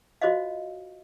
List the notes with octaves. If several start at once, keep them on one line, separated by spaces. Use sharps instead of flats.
F4 F#4 C5 C#5 D#5 F5